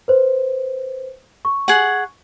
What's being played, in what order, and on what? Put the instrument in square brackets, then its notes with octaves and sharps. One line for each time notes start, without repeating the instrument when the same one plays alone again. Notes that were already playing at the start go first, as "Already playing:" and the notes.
[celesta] B4 C5
C#6
[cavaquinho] G#4 F#5